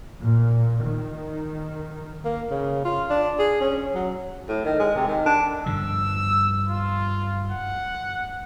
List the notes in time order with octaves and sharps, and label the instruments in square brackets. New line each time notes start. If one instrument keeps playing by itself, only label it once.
[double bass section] A#2
D#3
[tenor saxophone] A#3
C#3
F4
D4
G#4
C#4
F#3
A2
D#3
G#3
C3
D#3
D4
[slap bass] G2 D3 F3 [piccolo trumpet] E6
[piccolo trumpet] F4
F#5